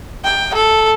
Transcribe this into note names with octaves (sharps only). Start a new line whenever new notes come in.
G5
A4